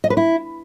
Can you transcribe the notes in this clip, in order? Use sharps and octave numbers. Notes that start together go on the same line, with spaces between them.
D#5
B4
E4